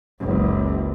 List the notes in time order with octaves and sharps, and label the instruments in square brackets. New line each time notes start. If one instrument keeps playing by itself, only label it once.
[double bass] F#1 C#2